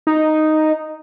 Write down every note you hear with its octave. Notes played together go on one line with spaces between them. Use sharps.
D#4